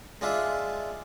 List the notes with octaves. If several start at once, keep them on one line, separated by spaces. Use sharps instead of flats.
G#3 D4 F4 E5